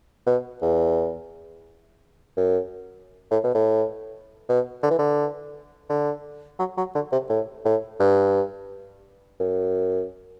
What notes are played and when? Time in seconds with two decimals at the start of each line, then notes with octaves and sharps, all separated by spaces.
0.26 B2
0.62 E2
2.37 F#2
3.31 A2
3.44 B2
3.55 A2
4.49 B2
4.83 D3
4.91 E3
4.98 D3
5.89 D3
6.59 F#3
6.77 F#3
6.95 D3
7.12 C3
7.29 A2
7.65 A2
8.00 G2
9.40 F#2